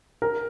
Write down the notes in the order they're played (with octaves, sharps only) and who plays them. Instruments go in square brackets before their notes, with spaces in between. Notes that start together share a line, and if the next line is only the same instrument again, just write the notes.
[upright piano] A#4